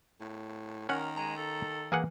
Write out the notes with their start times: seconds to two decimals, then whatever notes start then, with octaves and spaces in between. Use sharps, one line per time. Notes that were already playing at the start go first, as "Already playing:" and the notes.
0.20 A2
0.89 D#3 C#4 A#4 F#5
1.17 G#3 A#5
1.37 A4
1.92 E3 A#3 G#4 F#5